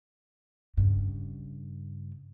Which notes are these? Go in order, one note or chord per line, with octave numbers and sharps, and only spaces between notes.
G2 C#3